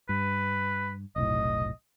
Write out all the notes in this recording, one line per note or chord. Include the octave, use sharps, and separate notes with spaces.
G2 B4
F1 B1 A2 D#5